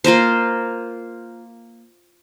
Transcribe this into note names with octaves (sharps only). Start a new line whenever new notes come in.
A#3 F4 A#4 C5